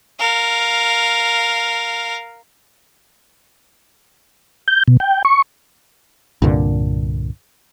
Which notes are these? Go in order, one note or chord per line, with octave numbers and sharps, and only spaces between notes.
A#4 F5
G6
B2
G5
C#6
C2 G2 A#2 D3